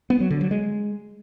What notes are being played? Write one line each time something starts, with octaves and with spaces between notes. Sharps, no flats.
B3
F#3
D3
F#3
G#3